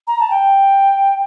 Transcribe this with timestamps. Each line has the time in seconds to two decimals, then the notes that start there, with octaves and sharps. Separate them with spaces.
0.07 A#5
0.20 A5
0.30 G5